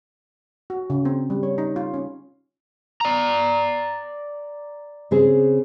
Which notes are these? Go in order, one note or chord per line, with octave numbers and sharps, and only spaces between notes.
F#4
C#3
C4
G3
C#5
D#4
F4
C#4
D5 A#5
C#3 C4 G#4